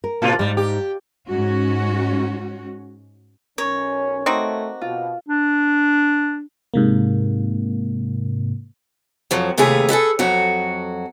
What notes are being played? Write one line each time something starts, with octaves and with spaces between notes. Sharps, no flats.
A#4
A2 C3 F4
G#2 G3 D#4
G4
G#2 C#4 F#4
B1 C#4 A#4 C#5
A3 C4 D#4 F#4 D6
B2 F4
D4
G#2 C3 A#3
F2 F3 F#3
D#2 C3 A3 F4 G#4 B4
G#4 A4 B4 E5
F2 F#3 F#4